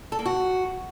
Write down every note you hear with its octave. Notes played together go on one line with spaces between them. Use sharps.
A4
A#3
F#4